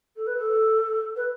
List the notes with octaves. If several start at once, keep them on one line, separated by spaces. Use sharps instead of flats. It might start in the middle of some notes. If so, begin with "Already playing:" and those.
A4
B4
A4
B4